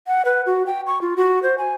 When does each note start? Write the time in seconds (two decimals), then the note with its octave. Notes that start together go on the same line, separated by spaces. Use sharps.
0.07 F#5
0.25 B4
0.46 F#4
0.66 G5
0.87 C#6
1.01 F4
1.17 F#4
1.43 C5
1.58 G#5